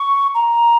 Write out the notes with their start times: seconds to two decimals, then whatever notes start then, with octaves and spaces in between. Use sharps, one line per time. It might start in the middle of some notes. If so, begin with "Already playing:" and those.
Already playing: C#6
0.35 A#5